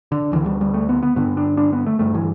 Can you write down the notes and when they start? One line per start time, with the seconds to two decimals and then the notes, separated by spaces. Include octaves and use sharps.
0.12 D3
0.32 D2 D3 E3
0.46 G3
0.61 G3
0.74 A3
0.89 B3
1.03 B3
1.16 G2 D3 B3
1.37 D4
1.57 D4
1.73 B3
1.86 A3
1.99 G2 D3 A3
2.14 E3